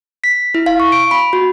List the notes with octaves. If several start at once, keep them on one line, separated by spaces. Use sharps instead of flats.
B6
E4
F5
C#6
D7
B5
F#4